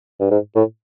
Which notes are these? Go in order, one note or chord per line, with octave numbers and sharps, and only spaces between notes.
G2
G#2
A2